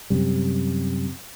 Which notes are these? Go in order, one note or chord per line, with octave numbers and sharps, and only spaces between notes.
F#2 C3 G3